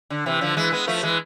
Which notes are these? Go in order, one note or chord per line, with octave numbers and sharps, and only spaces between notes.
D3
C3 E3
D3 F3
E3 G#3
G#3 B3
F3 A3
E3 G#3